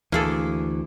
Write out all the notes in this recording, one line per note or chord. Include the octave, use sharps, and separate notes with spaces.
D2 E3 A#3 G#4 A4